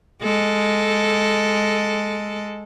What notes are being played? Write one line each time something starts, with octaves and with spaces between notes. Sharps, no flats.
G#3 A4